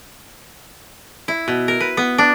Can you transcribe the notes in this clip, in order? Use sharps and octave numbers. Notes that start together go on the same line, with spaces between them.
E4
B2
A#4
B4
B3
D4